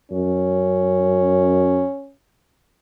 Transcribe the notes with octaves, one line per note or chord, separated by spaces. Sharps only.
F#2 C#4